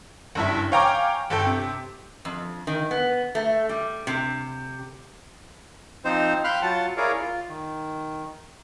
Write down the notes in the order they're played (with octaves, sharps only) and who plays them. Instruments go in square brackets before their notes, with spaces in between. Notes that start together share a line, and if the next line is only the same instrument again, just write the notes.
[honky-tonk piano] F#1 G2 E4
C#5 F5 G5 G#5 A#5 D6
G1 A4 G5
C3
[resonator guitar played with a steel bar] F2
D#3
B3
A3
G3
C3
[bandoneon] F3 C4 D#4 C5
F5 G5 B5 C6 F6 F#6
F#3 F4 F#5 A5
E4 G#4 A#4 C#5 D5 F5
F4
D#3